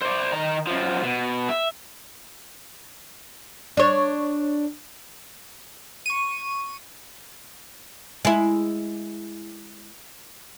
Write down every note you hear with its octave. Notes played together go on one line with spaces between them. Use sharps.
C5 D5
D#3 A#5
F#2 F3
B2
E5
D4 C#5
C#6 D#7
G#3 E4